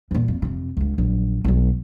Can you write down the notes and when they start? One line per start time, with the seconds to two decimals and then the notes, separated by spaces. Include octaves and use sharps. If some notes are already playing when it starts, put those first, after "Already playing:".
0.11 E2 A#2
0.28 F2
0.42 F2 C3
0.77 C#2 D3
0.98 A#1 F#3
1.44 B1 F#3